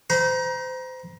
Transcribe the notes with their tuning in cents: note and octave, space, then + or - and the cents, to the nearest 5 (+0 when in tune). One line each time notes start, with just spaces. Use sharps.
C5 -30 A#5 +30